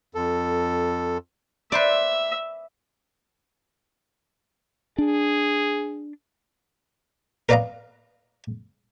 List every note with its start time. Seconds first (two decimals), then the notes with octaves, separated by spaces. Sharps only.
0.15 F2 A4
1.72 B4 C5 D5 E5
4.98 D4 G#4
7.49 A#4 B4 D5 D#5 F5 A#5